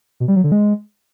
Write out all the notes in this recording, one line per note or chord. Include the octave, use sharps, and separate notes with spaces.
B2
G3
F#3
D3
G#3